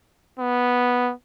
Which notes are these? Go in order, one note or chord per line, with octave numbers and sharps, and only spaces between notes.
B3